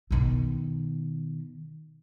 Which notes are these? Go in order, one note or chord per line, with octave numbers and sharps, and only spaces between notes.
B2 D#3